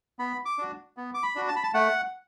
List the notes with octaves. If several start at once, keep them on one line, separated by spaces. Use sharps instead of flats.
B3 B5
D6
D4 F#4
B3
D6
B5
D4 F#4
A5
B5
A5
A3 F#5